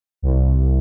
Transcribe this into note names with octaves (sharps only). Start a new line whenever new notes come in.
C2